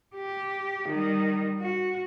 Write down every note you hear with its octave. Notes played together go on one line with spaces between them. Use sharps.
G4
D#3 G3
F#4